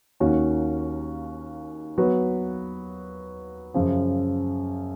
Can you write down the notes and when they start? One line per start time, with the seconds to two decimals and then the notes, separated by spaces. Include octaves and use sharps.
0.20 D#2 D#3 A#3 C#4 F#4
1.98 F#3 B3 F#4 B4
3.74 F#2 C#3 F3